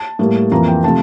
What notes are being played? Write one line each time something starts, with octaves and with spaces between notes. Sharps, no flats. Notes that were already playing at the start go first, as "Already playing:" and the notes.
Already playing: A5
A2 G3 A#3
F2 E3 A#3 A#5
G5
C3 F3 A3 A5